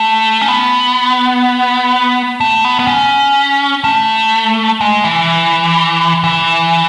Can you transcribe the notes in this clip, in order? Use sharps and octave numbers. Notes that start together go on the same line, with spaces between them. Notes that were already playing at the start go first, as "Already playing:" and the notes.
Already playing: A3
C#4
B3
A3
B3
B3
C#4
A3
G#3
E3
E3